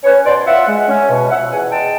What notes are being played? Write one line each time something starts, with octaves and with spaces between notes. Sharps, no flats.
C#4 B4 C#5
B2 C5 D5
F4 E5 F#5
G#3
C#4
B2
F3 E5 F#5
E2 F#5 G#5
G#3 G5 A5